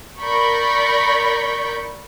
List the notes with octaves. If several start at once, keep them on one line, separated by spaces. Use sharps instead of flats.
A#4 D5 B5 C#6 G6